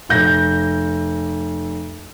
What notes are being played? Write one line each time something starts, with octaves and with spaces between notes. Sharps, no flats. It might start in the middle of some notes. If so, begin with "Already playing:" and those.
F1 G6 A#6